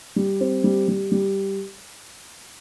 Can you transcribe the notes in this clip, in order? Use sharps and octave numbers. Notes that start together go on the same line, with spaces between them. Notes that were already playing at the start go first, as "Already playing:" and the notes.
G3
C4
G3
G3
G3